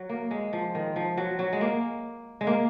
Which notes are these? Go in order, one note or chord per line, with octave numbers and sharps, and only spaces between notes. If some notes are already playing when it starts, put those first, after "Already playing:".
Already playing: F#3
A#3
G#3
F3
D#3
F3
F#3
F#3
G#3
A#3
G#3
A#3